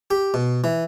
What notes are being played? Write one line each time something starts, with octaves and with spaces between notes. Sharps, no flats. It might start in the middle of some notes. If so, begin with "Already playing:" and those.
G4
B2
E3